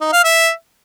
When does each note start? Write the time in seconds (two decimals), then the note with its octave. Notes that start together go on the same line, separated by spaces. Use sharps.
0.01 D#4
0.12 F5
0.24 E5